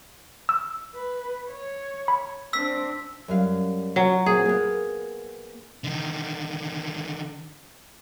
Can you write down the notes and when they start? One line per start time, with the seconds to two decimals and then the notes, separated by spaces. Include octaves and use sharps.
0.49 E6
0.94 B4
1.48 C#5
2.08 B5
2.53 C4 D4 E6 B6
3.28 F#2 G3 F5
3.96 F#3
4.26 A#2 C4 G#4
4.45 A#3 B3
5.84 D3 D#3